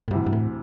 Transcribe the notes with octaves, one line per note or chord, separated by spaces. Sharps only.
A2
D2 G2 C3 E3
G2
A2